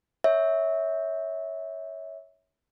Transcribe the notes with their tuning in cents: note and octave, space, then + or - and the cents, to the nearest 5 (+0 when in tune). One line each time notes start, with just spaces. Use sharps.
C#5 +5 E5 -20